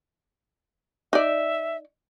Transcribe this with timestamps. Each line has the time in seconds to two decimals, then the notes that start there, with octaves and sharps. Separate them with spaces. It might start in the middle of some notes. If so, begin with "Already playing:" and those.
1.13 D#4 D5 E5